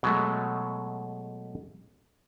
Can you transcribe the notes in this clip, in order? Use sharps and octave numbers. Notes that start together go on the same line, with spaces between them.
B2 F#3 G#3 A3